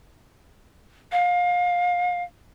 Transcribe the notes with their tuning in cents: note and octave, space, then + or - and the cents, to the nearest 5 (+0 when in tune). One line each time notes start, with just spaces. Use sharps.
F5 +30